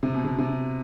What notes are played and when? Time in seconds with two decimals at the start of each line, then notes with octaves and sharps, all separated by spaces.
0.03 C3
0.14 B2
0.25 C3
0.38 C3